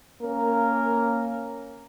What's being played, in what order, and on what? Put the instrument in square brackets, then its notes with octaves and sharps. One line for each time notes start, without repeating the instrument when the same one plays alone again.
[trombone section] A#3 C#4 A#4